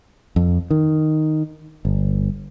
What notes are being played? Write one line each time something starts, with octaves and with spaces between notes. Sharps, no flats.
F2
D#3
G1